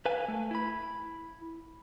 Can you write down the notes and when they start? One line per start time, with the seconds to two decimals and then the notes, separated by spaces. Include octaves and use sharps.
0.06 B4 F5 G#5
0.28 A3
0.51 E4 B5